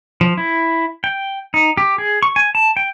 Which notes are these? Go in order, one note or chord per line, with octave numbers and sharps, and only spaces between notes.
F3
E4
G5
D#4
G4
G#4
C#6
G#5
A5
G5